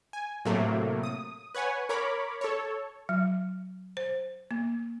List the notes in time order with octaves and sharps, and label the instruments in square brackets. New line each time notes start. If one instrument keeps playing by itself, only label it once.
[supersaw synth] G#5
A2 C3 F#3 A3 A#3
D#6
B4 C#5 F#5 G#5
A#4 C#5 B5 D6
A4 C#5
[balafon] F#3
C5
A#3